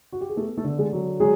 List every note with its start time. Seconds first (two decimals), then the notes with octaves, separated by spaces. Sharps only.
0.13 F#4
0.21 G4
0.29 G#4
0.37 A3 B3 A4
0.57 A3 A4
0.64 D3
0.79 G#3 G#4
0.93 F#3
1.20 F#3 G#3 G#4